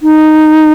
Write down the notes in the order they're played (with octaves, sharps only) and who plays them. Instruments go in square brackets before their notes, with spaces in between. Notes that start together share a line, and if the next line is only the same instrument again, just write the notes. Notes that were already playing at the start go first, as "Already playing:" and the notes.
[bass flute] D#4